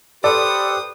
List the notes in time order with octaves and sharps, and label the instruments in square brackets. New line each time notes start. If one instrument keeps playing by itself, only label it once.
[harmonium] G4 B4 C5 [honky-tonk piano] A4 [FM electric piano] D5 [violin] D#6